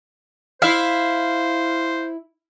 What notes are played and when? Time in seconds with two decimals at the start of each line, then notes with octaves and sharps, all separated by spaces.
0.62 E4 C5 E5 F5